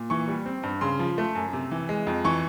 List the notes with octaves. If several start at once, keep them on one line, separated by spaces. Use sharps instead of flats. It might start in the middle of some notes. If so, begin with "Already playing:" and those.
Already playing: A#2
E3 C#6
G3
C4
G2
C#3 C6
F3
A3
F#2
C3
E3
G#3
F2
E3 C#6